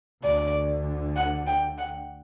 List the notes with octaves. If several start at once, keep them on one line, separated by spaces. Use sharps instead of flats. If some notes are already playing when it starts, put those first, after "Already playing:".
D2 D3 D5
F#5
G5
F#5